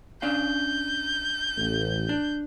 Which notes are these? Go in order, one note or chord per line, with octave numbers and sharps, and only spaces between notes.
C#4 D4 F5 G6
A1
D4